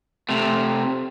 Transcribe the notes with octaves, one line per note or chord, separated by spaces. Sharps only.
C3 A3